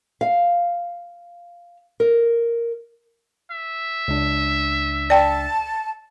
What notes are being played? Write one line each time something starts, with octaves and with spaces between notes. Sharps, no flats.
F5
A#4
E5
C#2 D4
D5 G5 A5